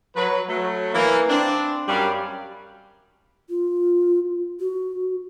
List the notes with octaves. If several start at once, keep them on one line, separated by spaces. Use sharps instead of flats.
F#3 B4
F#3 A3
E3 A#3
C4 D4
F#2 G3 F5
F4
F#4